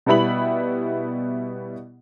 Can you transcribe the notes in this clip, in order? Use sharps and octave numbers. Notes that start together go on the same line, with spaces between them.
B2 G3 B3 E4 B5 F#7